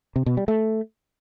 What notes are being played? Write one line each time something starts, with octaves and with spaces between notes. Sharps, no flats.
C3
B2
G3
A3